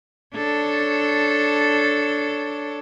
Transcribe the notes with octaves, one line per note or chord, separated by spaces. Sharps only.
D4 A4 C#5